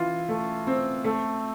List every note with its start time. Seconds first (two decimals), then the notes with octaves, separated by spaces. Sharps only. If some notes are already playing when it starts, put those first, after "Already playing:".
Already playing: E3 F4
0.29 A3
0.67 C4
1.04 A3